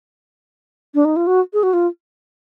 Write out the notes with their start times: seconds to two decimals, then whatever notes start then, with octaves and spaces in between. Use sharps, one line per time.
0.95 D4
1.05 D#4
1.16 F4
1.27 F#4
1.53 G#4
1.63 F#4
1.73 F4